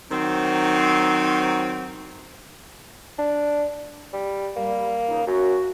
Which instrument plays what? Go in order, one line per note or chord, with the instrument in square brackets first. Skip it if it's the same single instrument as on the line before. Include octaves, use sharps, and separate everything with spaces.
[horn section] D#3 F#3 C4
[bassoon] D4
G3
[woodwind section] G3 [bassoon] A#3
[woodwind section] C#2 C#3 D#4
[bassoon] F#2 [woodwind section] F#4